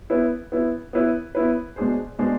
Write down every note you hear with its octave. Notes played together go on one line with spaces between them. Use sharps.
B3 E4 B4
B3 E4 B4
B3 E4 B4
B3 E4 B4
B2 G#3 D4 G#4 C5
B2 G#3 D4 G#4 C5